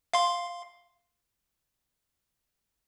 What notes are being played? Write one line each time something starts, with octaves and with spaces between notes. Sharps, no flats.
F5 C6